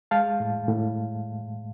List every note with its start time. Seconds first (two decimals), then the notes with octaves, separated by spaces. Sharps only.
0.11 G#3 F5 A5
0.40 A2
0.68 A2